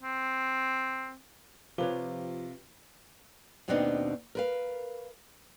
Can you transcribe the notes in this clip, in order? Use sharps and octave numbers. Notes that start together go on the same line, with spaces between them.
C4
C3 F3 F4 G4 B4 C#5 G7
D#2 B2 B3 C4 D4 D#4
A#4 B4 F5